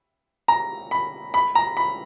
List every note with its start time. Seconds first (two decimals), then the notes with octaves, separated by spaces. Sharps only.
0.48 A#5
0.91 B5
1.34 B5
1.55 A#5
1.77 B5